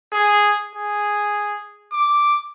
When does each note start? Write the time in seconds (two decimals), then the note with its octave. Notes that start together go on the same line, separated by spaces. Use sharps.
0.13 G#4
0.76 G#4
1.93 D6